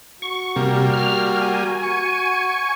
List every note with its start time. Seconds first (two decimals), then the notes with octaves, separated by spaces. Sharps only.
0.22 F#4 C#6
0.56 C3 G3 A#3
0.93 F6
1.42 G#5
1.83 C#6